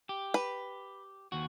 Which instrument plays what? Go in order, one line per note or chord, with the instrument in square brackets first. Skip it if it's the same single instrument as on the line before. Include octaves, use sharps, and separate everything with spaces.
[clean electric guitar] G4
[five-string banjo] B4
[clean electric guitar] D#2 F#4